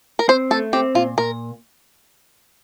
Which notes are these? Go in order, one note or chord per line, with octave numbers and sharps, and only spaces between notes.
A#4
C4 C5
A3 A4
C4 G4
A#2 F4
A#2 A#4